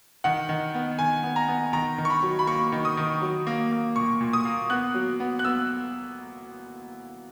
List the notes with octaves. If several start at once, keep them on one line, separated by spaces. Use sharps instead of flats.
D#3 F#5
D#3
B3
D#3 G#5
B3
A#5
B3
D#3 A#5
D#3
C#6
B5
F#3
B5
A#3 C#6
D#3
D#6
D#3
F#3
A#3
A#3
A#2 C#6
A#2
D#6
A#3
B3 F#6
F#3
B3
F#6
B3 E6